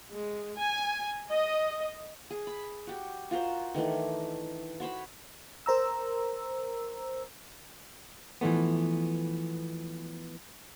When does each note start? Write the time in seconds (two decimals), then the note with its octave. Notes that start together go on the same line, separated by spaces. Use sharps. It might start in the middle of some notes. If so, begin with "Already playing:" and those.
0.11 G#3
0.58 G#5
1.30 D#5
2.30 G#4
2.47 B5
2.87 F#4 G4
3.31 F4 F#4 A#4 C5
3.74 D#3 E3 A3 D4
4.80 F#4 C5 C#5 B5
5.66 A#4 C5 A#5 E6
8.41 E3 F3 A3 B3